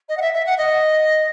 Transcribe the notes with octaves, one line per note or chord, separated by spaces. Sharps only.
D#5
F#5
E5
E5
F#5
D#5